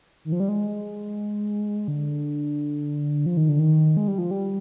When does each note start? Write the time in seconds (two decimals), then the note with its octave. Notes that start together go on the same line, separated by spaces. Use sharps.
0.25 D#3
0.32 F3
0.40 G3
0.49 G#3
1.88 D3
3.26 F3
3.37 D#3
3.49 D3
3.59 D#3
3.97 G#3
4.08 G3
4.18 F3
4.31 G3